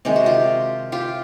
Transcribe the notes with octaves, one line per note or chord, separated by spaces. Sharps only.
C3 D#3 G#3 G4
F#4
F4 G4
F4 G4